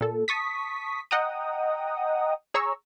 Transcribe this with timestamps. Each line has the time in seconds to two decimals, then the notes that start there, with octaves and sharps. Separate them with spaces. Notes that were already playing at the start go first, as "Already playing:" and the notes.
0.01 A#2 A4
0.28 A5 C#6 D#6 B6
1.11 D#5 F#5 G5 A#5 D#6
2.54 G#4 C#5 A#5 C#6 E6